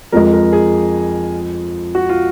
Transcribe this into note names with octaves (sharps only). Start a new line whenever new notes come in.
F2 F3 G#3 A#4
A#4
G#4
F#4
F4